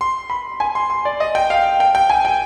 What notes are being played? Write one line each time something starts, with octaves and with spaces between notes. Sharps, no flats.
C6
B5
G#5
C6
C6
D5
D#5
G5
F5
G5
G5
G#5
G5